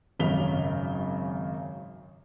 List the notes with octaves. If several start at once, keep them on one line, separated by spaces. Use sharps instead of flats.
G#1 F#2 C#3 B6 F7 G7